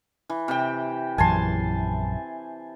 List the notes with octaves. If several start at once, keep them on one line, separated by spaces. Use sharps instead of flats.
E3
C3 G5
A#1 F#2 E3 G#5 A5 C6